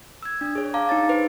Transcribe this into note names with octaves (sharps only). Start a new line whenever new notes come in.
E6 G#6
D4
G#4 C#5
F5 A5 A#5 D6
D#4 C#5 A6
B4 C5